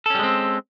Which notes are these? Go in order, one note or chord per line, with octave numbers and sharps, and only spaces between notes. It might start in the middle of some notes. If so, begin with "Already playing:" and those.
G3 G#3 C4 C#4 A4